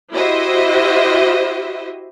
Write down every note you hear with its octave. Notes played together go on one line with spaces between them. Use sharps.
E4 F#4 G4 C5 D#5 E5